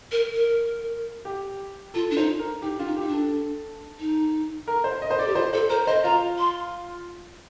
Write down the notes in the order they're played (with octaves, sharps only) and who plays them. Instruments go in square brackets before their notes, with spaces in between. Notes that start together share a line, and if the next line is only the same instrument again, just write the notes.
[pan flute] A#4
A#4
[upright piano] G4
[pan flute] F4 [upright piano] A4
[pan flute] D4
[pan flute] D#4 [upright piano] C5
[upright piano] A#4
[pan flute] D#4 [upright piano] G4
[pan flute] D4 [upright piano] F4
[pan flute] D#4
[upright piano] G4
[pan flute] D#4
D4
[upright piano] A4
[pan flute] D#4
[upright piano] A#4
C5
D#5
C5
[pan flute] A4 [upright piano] D5
[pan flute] G4
[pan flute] F4 [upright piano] C5
[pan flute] A4 [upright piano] C5
[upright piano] A#4 [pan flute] C5
[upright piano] C5 [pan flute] D#5
[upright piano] F4 [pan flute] A#5
[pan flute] C6